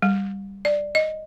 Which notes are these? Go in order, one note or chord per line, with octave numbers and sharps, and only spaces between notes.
G3
D5
D#5